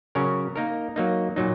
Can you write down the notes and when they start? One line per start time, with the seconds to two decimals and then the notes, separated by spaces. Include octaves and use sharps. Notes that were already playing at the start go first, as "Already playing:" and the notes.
0.15 C#3 F#3 C#4 A#4
0.56 A#3 D#4 A#4
0.96 F#3 A#3 D#4
1.36 A#2 F#3 D#4